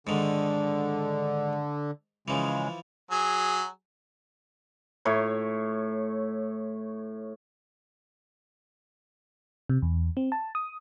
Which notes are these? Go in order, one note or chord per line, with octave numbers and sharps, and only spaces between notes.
G#2 D3 D#3
C#3 E3 F3 G#3
F#3 G#4
A2 C#5
C3
E2
C4
A5
D#6